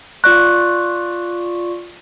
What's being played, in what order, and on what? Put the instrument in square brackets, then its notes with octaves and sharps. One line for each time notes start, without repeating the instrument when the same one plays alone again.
[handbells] F4 D5 C#6 [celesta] F#6